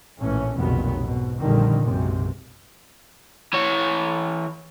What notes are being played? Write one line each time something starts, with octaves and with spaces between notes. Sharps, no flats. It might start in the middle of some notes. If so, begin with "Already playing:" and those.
A#1 A2 E3 C#4
F1 B1 A#2 D#3 F#3 B3
G#2 B2
A#1 F2 A#2 D3 D#3 G3
B1 F#2 C3 G#3
E3 C#5